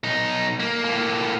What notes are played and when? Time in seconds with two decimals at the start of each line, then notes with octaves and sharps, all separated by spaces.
0.04 B1 D#4
0.60 A#3
0.85 A2 A#3